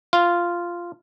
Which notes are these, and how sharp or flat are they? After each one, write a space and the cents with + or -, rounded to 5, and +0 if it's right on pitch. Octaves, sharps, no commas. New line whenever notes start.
F4 -5